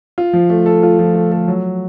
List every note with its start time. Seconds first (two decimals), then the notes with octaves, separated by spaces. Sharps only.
0.18 F4
0.33 F3
0.50 A3
0.66 A4
0.83 F4
0.99 F3
1.15 A3
1.32 A4
1.48 F#3